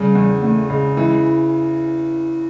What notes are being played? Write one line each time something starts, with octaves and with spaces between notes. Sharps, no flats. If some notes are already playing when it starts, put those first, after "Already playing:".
Already playing: C#3 G3
E2
E2 A3
C#3 G#3
E3 G#3